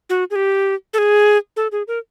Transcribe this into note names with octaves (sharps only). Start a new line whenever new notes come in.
F#4
G#4
G4
A4
G#4
A4
G#4
A#4